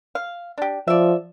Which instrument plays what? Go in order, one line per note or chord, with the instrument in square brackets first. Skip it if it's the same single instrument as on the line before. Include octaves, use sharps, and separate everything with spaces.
[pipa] F5
D4 G4
[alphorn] F3 [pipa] D5 E5